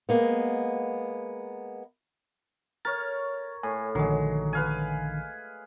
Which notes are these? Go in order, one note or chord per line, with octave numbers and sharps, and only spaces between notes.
G#3 A#3 B3
A#4 C#5 F6 A6
A2 G#5
A#1 D3 D#3 F#3 G#3
B4 F5 G#5